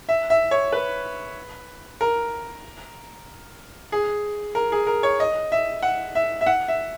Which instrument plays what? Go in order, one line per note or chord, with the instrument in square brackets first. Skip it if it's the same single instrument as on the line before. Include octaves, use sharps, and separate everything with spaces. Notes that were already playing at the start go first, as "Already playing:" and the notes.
[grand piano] E5
E5
C#5
B4
A#4
G#4
A#4
G#4
A#4
C#5
D#5
E5
F#5
E5
E5
F#5
E5